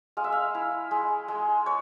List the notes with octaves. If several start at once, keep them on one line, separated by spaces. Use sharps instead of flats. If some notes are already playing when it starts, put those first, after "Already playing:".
G#3 F5
E5
F5
E4
G#3
G#3
C#5